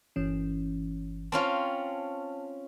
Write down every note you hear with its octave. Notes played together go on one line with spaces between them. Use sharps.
G1 E3 C#4
C4 C#4 F4 A5